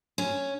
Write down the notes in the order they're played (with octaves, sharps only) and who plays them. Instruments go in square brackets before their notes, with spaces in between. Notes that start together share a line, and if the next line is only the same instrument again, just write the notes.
[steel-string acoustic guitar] C#4